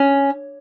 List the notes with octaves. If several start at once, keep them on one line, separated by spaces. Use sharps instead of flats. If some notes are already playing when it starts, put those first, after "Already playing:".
Already playing: C#4